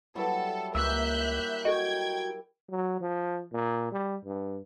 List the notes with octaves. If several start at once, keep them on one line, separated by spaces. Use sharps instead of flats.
F#3 G3 E4 A4
C#2 A#3 E5 E6 F#6 G6
F#4 A4 D#5 G5 G#6
F#3
F3
A#2
G3
G2